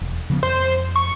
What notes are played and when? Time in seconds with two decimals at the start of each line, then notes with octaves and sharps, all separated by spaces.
0.01 E1
0.30 C#3 F3 B3
0.43 F2 C5
0.96 C#6